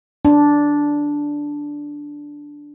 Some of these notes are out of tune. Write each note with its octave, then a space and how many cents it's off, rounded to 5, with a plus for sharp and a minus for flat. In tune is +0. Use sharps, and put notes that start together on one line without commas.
D4 -5